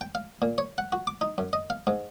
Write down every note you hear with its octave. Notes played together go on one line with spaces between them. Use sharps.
G5
F5
A#2
C#5
F#5
F#4
D6
D#4
F#2
D#5
F5
G#2